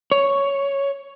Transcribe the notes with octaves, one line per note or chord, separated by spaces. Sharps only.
C#5